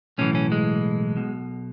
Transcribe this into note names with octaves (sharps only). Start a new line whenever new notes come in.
B1 A2 E3 C#4
C#4
G#3
B1 B2